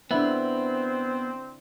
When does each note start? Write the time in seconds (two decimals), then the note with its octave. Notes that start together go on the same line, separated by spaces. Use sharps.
0.11 D3 B3 C4 E4 C5